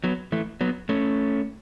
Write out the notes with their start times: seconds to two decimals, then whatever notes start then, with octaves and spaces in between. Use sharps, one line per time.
0.04 F#3 B3
0.32 E3 A3
0.61 F#3 B3
0.89 A3 C#4